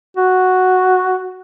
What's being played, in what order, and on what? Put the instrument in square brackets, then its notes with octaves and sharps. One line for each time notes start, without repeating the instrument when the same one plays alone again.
[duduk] F#4